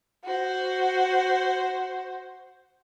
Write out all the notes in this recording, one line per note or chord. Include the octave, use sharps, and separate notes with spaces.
F#4 C5